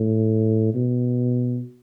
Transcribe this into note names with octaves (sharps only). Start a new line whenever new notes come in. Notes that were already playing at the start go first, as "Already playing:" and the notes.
Already playing: A2
B2